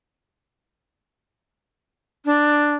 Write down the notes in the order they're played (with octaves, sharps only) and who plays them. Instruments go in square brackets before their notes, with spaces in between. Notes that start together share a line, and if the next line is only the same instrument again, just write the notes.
[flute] D4